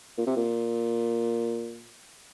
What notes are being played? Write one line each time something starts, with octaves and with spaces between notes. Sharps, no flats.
A#2
C3
A#2